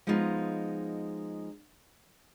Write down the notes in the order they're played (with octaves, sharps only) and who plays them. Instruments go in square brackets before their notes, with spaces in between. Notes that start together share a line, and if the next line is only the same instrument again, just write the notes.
[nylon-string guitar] F3 G#3 B3 D#4 F4